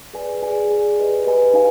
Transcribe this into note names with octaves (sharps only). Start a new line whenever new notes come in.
G#4 B4 D5 G#5
G#4 D5 G#5
G#4 D5 G#5
G4 B4 D#5 G#5
G4 B4 D#5 G#5
D#4 B4 F5 G#5